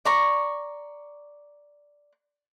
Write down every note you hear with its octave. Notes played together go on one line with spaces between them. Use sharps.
D5 A#5 C#6